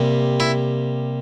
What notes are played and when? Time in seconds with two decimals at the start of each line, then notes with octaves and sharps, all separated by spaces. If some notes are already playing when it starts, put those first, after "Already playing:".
Already playing: C3 G3 A#3
0.40 E4